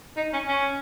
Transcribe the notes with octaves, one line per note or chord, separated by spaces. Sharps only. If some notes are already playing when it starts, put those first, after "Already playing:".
D#4
C#4
C#4